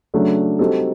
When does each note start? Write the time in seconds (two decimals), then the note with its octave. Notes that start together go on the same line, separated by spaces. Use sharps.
0.14 C#3 F#3 A3 D4
0.59 G3 C4 D#4 F#4 A4